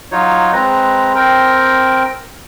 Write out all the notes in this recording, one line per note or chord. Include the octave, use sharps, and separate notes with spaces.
F#3 D#4 F4 C#5
G#3 C4 B4 A#5
C4 A#4 G5